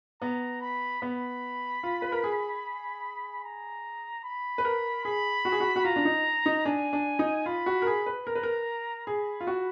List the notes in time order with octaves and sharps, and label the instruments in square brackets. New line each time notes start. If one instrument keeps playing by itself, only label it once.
[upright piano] B3 [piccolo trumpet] A#5
[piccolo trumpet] B5
[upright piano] B3 [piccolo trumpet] B5
[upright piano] F4
B4
A#4
G#4
[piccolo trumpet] A#5
B5
[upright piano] B4
A#4
[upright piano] G#4 [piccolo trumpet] B5
[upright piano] F#4
G#4
F#4
F#4
[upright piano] F4 [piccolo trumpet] A#5
[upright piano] D4
D#4
D#4
[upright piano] D4 [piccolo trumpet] G#5
[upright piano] D4
D#4
[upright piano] F4 [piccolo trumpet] B5
[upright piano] F#4
A#4
G#4
B4
[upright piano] A#4 [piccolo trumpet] A#5
[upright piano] B4
A#4
[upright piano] G#4 [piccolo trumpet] B5
[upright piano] F4
F#4